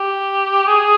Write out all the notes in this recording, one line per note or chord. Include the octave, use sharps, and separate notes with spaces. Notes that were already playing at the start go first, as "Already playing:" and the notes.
Already playing: G4
G#4